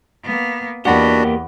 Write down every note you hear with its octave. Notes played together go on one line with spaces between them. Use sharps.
A#3 B3
E2 A#3 D4 F#4 G4 F#5 B5